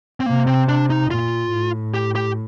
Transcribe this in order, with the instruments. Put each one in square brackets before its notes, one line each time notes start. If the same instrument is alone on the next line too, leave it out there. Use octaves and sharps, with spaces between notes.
[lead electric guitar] C4
[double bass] C3 [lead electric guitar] A#3
[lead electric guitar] C4
D4
D#4
[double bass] A#2 [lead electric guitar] F4
[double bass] A2
[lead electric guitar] G4
G4